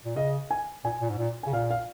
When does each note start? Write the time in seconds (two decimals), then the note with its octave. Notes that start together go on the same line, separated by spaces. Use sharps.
0.05 A#2
0.16 C#3 D#5
0.51 G#5
0.84 A#2 G#5
1.01 A#2
1.10 G#2
1.18 A#2
1.43 C#3 G#5
1.53 A#2 F5
1.71 F5